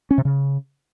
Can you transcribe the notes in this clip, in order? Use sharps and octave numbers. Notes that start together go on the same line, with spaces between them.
C#4
C3
C#3